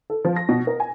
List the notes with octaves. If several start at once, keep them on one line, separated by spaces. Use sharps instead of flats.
A4
F3
A#6
B2
A#4
G#5